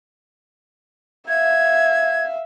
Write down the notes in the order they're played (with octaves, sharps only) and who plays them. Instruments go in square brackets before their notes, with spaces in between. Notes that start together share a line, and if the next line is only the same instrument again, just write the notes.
[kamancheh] E5 F5 [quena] G#6